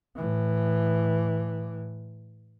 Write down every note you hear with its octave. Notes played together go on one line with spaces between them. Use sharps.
A2 E3